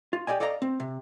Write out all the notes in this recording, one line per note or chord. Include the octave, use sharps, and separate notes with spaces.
F4
G4 A#4 D5 D#5 G#5
A4 D5 D#5 F5 G5 A#5
C4
C3